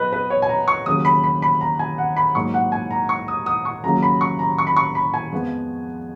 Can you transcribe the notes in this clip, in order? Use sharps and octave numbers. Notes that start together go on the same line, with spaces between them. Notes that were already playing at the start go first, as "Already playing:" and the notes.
Already playing: B2 F#3 B3 B4 D#5
B4
C#5
G#5
A#5
C#6
D#2 C#3 F#3 D#6
B5
B5
B5
A#5
G#5
F#5
B5
G#2 F#3 A#3 C#6
F#5
G#5
A#5
C#6
D#6
D#6
C#6
D#2 C#3 F#3 A#3 A#5
B5
C#6
A#5
C#6
B5
C#6
B5
G#5
F2 F3 G#3 B3